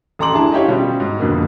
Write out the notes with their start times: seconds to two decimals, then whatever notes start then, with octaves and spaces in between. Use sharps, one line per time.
0.19 A1 A4 A#5 C6 D6 F#7
0.33 D4 E4 G#4 A5
0.52 D#4 E4 G4 C#5 F5
0.68 B2 G3 C#4 F4
1.00 G#2
1.20 F2 B2 D3 A#3